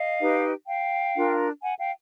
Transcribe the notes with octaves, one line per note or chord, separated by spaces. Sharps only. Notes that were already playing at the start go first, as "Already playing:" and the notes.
Already playing: D#5 F5
D#4 G4 B4
F5 G5
D4 F4 A#4
F#5 G#5
F5 G5